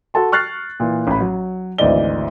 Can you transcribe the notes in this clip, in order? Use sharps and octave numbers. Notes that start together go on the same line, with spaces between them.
F#4 A4 A5 C6
C#6 F6 F#6 A6 C7
A#2 E3
A1 B5
F#3
G#1 D2 E3 D5 D#5 G7